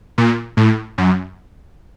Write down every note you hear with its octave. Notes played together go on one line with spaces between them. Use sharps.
A#2
A2
F#2